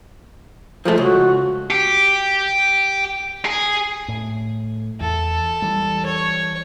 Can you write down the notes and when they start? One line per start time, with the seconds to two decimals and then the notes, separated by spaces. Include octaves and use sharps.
0.85 F3 G#3 A3
0.98 C#2 F#4
1.70 G4
3.45 G#4
4.08 A2
5.00 E2 A4
5.62 E3 G3
6.05 C#5